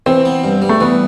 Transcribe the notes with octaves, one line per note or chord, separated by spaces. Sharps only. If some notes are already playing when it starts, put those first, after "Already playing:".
E3 C4
B3
G2
G3
A3
E3 B3